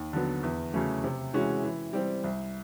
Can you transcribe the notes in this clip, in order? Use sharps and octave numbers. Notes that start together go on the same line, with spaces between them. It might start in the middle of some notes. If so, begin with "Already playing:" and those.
Already playing: D#2
D3 F#3 B3
E2
C#3 F#3 A3 C#4
C3
E3 G#3 C#4 F#4
E3
G3 C4
C2